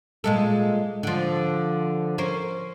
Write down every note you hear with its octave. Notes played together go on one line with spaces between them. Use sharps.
A#2 G#3 A4
D3 F3
C#4 A#4 C5